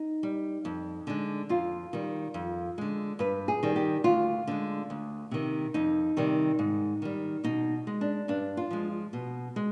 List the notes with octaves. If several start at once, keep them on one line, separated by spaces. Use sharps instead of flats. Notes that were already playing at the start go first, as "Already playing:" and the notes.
Already playing: D#4
G3
F2
D3 G#3
F2 F4
D#3 G3
F2
D3 G#3
G2 B4
G#4
D#3 G3
G4
D2 F4
D3 G#3
D2
C3 D#3
F2 D#4
C3 D#3 G3
G#2
D#3 G3
B2 D#4
G#3
D4
G2 D4
F4
F3 G#3
B2
G#3